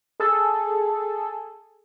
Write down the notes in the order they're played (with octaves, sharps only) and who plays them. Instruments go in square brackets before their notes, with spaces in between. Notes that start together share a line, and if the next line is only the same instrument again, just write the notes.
[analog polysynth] G#4 A4